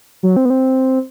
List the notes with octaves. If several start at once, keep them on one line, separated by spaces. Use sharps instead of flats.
F#3
C4
B3
C4